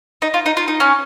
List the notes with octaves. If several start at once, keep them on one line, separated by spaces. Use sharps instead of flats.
D#4
F4
D#4
F4
D#4
C#4